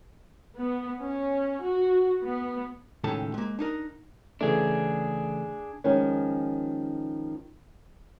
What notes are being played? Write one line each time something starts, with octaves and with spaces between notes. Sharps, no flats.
B3
C#4
F#4
B3
C#2 A2 D#3 C#4 A4 A5
G#3 A#3
D4 D#4 A#4
C#3 E3 A3 D4 G#4
D#3 F3 G#3 C#4